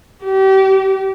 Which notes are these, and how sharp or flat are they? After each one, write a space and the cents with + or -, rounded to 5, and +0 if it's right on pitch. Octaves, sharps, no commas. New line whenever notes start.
G4 -30